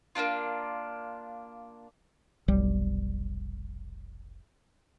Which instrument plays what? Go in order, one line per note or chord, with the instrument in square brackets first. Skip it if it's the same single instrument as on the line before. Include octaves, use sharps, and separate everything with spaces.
[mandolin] A#3 C#4 D4 F4
[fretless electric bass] F1 B1 G3